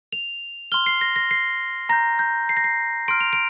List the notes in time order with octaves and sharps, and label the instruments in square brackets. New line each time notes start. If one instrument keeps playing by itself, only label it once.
[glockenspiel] F7
C6 F6 G7
C7
A#6
A#6
C7
A#5 G6 A#6
G6
C7
A#6
C7
C6 F6 D7
F7
D7